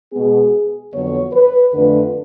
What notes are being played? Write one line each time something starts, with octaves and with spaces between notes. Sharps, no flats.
B2 G#3 B3 G#4
F2 D3 F#3 B3 C#5
B4
F2 D3 F3 A3 D4 B4